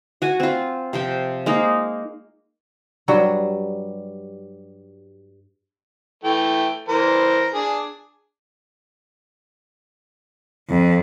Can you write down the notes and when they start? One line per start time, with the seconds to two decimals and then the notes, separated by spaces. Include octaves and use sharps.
0.22 F#4 G#5
0.40 C4 F4
0.93 C3 F3 G5
1.46 G#3 A#3 D#4
3.08 G2 F#3 G3 F#5
6.24 E3 A3 G5
6.89 E3 A#4 C5
7.54 D4 G#4
10.69 F2